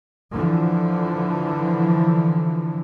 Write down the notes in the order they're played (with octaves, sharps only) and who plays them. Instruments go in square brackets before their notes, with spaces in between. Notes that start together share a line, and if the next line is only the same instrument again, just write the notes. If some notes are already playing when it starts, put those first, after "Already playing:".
[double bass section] D3 E3 F3